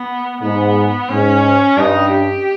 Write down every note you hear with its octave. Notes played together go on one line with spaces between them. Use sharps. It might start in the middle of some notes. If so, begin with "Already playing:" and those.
Already playing: B3
G#2 B3
G#2 C#4
G2 D#4
G4